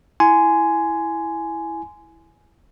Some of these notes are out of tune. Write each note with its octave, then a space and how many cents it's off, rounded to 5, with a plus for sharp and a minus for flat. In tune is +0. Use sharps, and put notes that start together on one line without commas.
E4 +0 G#5 +10 C6 -20